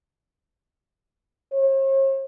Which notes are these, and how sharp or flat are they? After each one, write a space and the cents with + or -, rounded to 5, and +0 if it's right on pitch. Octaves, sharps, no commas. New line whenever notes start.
C#5 -45